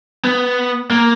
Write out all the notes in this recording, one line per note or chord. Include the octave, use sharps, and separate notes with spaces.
B3
A#3